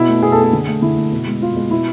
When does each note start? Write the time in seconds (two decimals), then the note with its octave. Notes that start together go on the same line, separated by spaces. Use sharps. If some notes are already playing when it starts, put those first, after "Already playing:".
Already playing: B2 E4
0.08 A3
0.22 B2 G#4
0.32 A4
0.38 A3
0.43 G#4
0.53 D3
0.67 A3
0.82 D3 E4
0.97 A3
1.12 B2
1.27 G#3
1.42 B2 F4
1.56 G#3
1.71 B2 E4